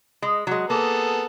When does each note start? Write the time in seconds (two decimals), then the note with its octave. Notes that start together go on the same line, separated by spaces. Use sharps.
0.22 G#3
0.47 F#3 G#3
0.70 A#3 B3 G#4 A4